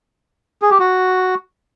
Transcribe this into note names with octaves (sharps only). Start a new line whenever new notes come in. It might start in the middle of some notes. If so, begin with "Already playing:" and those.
G#4
G4
F#4